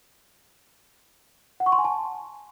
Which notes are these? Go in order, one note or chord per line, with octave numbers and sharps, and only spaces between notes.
F#5
C#6
C6
G#5
A5